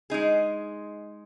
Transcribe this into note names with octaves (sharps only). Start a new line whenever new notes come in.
G#3 D#4 G#4